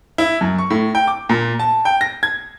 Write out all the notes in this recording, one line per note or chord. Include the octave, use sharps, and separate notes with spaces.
E4
F#2
C#6
A2
G5
D6
A#2
A5
G5
A#6
G#6